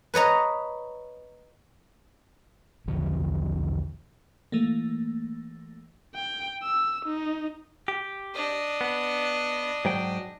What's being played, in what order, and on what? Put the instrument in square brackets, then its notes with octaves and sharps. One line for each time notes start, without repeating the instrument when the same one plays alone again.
[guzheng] B4 C#5 D#5 A#5
[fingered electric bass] B1 E2 D3 F3
[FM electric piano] E3 A3 A#3
[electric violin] G5
E6
D#4
[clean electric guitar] G4
[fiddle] D4 D#5
[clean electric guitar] B3
G#2 F#3 G5